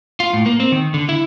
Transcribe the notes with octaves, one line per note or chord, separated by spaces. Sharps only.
F4
A2
A#3
C4
D#3
D3
E4